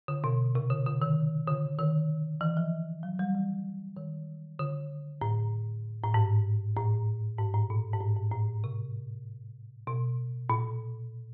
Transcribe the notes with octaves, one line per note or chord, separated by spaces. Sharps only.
D3
B2
C3
D3
D3
D#3
D3
D#3
E3
F3
F#3
G3
E3
D#3
D3
A2
A2
G#2
A2
G#2
A2
A#2
G#2
A2
G#2
A2
C3
B2
A#2